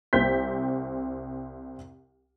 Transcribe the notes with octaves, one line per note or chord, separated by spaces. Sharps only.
C2 C4 G6 B6